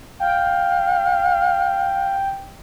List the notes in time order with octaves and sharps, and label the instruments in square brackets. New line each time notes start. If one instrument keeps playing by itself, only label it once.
[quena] F5 [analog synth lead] G5